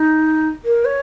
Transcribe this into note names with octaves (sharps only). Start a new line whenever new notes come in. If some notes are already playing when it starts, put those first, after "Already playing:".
Already playing: D#4
A#4
C#5